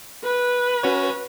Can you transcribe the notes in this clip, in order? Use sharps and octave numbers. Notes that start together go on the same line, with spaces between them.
B4
C#4 F#4 C#5